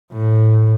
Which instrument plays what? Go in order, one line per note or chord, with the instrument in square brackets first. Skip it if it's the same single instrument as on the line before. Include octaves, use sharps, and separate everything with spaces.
[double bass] A2